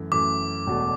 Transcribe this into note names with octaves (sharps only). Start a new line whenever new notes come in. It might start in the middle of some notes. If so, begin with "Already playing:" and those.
Already playing: F#2 E3 A3
F#2 E3 A3 D6
E1 E2 B2 A3